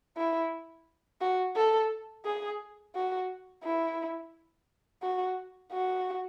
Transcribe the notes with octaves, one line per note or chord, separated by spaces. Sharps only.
E4
F#4
A4
G#4
F#4
E4
F#4
F#4